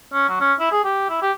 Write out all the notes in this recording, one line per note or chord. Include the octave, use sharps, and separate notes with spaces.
C#4
F#3
C#4
E4
G#4
G4
E4
G4